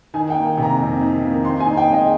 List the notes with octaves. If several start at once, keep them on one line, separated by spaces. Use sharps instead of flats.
D#3 G#5
G5
A#3
C3
A#5
F2
D#3
A#3
C4 C6
G#5
D#4
G5
G#3
D#5